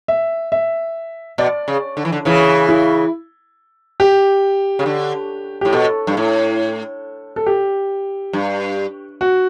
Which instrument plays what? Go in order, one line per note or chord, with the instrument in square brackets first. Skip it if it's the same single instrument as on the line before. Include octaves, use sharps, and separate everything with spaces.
[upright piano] E5
E5
[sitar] B2 [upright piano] D5
[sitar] C#3
D3
E3
D3
[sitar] C#3 E3 [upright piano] C#5
[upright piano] E4
G4
[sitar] C#3
D3
[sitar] A2 [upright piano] G4
[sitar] B2 [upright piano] A4
[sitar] G2
A2
[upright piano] A4
G4
[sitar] G2
[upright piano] F#4